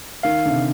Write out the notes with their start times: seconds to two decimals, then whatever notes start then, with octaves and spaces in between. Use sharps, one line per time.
0.23 D#3 F5
0.46 D3
0.51 C3